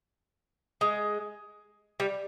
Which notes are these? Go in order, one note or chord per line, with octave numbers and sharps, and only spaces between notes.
G#3
G3